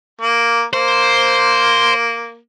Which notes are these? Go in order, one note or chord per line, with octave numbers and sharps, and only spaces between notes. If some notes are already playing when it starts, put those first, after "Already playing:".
A#3
A#3 C5